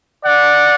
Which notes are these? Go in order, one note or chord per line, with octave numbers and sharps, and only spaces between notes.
D5 F#5